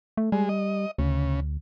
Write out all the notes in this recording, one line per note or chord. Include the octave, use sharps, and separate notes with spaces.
A3
G3 G#3
D#5
D2 C#3